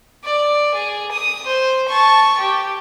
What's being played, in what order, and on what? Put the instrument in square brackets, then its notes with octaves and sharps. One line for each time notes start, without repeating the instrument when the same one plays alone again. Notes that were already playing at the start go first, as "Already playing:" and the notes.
[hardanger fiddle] D5
G#4
D#6
C5
A5 C#6
G4